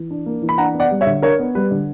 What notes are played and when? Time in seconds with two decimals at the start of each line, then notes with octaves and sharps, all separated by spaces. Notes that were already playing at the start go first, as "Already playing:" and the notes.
Already playing: E3
0.11 D4
0.26 A#3
0.42 E3
0.49 B5
0.58 D4 F#5 A#5
0.74 B3
0.80 D5 F#5
0.91 G3
1.01 C#5 E5
1.06 D3
1.22 D4 A#4 C#5
1.39 B3
1.55 G3 B4
1.71 D3